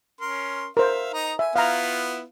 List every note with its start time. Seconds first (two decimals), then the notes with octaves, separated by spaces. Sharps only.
0.21 C#4 A#4 C6
0.77 A#4 C5 E5 F5
1.13 D#4 D#5 A#5
1.39 E5 G#5
1.56 B3 E4 F4 F5 A#5